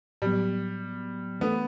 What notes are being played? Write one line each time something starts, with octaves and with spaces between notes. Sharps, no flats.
A2 F#3 G3 B3
E3 A3 B3 D4 A4